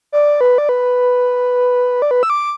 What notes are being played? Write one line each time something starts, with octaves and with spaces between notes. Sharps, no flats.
D5
B4
D5
B4
D5
B4
E6
D6